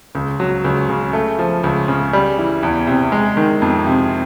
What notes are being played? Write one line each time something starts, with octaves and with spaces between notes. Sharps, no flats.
C#2
F#3
C#2
C#3
A3
F3
C#2
C#3
G3
E3
E2
C3
G#3
D#3
F2
C3